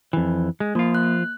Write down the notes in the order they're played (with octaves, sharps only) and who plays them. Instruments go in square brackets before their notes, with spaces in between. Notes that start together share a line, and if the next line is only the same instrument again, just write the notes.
[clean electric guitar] F2 E3
G#3
[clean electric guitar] F3 F4 [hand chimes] A#3
[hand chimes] F#6